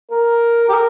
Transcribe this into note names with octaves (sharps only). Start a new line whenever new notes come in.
A#4
G4
A#4